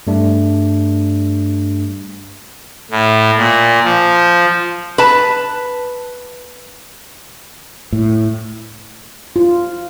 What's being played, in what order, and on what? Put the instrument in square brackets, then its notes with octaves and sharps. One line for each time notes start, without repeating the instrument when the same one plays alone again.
[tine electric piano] G2 G3 A3 D4
[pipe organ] A2
A#2
F3
[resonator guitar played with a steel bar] B4 A5
[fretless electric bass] A2
[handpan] F4